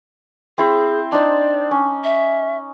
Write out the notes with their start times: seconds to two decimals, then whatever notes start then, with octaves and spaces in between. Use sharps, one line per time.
0.58 C4 E4 G#4 C5
1.12 D4 D#4 C5 D5
1.71 C#4
2.04 E5